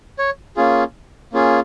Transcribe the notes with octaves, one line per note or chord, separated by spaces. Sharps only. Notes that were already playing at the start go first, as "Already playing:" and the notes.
C#5
A#3 C#4 F4 G#4
A#3 C#4 F4 G#4